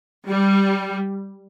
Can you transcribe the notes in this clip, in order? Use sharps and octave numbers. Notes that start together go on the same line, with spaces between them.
G3